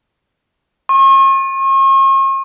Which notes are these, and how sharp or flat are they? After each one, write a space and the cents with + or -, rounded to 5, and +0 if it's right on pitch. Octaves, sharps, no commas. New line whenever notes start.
C#6 -45